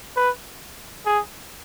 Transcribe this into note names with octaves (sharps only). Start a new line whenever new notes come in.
B4
G#4